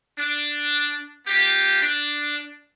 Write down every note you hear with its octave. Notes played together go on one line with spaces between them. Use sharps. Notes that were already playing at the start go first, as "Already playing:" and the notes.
D4
A#3 F4 G4
D4